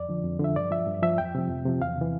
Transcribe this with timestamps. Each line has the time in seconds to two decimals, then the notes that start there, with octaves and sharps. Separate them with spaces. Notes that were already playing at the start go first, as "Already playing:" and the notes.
Already playing: F2 D5
0.09 D3 F3
0.24 F2
0.39 D3 F3 E5
0.56 G2 D5
0.71 F3 E5
0.87 G2
1.03 F3 E5
1.18 F2 G5
1.35 C3 F3
1.50 F2
1.66 C3 F3
1.81 E2 F5
1.97 C3 E3